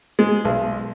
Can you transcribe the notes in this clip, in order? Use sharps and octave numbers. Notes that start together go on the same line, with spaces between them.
G#3
B1